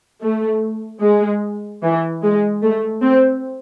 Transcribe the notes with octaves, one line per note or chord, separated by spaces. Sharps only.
A3
G#3
E3
G#3
A3
C4